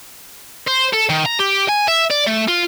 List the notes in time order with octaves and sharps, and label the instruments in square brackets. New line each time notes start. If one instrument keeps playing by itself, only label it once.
[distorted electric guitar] C5
A4
D#3
A#5
G4
G#5
E5
D5
A3
F4